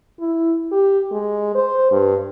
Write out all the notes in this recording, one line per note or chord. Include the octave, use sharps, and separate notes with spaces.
E4
G4
G#3
C5
G2